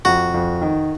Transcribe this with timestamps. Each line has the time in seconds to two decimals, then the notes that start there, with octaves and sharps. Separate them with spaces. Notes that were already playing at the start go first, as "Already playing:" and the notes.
0.05 F2 F#4
0.34 F2
0.62 D#3